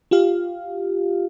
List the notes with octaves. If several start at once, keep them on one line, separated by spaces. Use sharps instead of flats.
F4 G4 F5